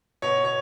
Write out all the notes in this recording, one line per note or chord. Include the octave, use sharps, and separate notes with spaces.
B2 C#5
C#5